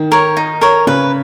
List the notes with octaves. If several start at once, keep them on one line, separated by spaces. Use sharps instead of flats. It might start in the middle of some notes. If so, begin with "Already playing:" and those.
Already playing: D#3
A#4 C#5
D#4
A#4 C#5
C#3 B4